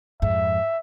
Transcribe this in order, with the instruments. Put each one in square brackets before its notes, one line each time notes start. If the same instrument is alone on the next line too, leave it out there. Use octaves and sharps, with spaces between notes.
[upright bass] F2 G#2 [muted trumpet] E5